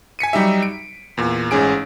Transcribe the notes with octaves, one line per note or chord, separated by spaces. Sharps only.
G#5 B6 C#7 D#7
F#3 G3 D#4 G4 E5
D7
E2 A#2
A1 G#2 C#4 G#4 D7